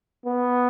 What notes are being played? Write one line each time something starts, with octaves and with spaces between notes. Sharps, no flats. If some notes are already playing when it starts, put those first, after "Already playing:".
B3